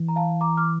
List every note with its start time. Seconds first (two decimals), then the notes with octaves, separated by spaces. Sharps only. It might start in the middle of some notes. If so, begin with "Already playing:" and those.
Already playing: E3
0.08 A#5
0.16 F5 A5
0.41 A#5 D6
0.57 D6 F6